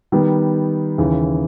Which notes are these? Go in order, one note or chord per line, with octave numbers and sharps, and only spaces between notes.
D#3 G3 B3
D#2 C#3 E3